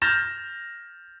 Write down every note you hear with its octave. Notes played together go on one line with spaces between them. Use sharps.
F6 G6 A6 A#6 E7